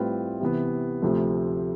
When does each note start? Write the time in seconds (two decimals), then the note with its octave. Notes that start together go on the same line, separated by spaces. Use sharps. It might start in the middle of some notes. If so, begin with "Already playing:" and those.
Already playing: A2 G3 C4 F4 B4
0.41 C3 E3 B3
1.02 D2 C3 F3 A3